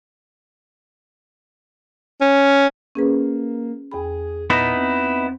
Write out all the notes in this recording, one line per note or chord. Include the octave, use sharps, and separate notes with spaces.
C#4
A#3 C#4 G#4 B4
E2 G#4 G5 B5
A#2 B3 D#4 E4
C4